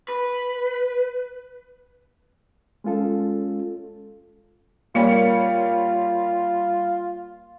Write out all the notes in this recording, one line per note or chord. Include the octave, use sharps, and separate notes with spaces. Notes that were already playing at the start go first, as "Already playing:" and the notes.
B4
G#3 C#4 F4 A4
G3 A#3 F4 C#5 C#7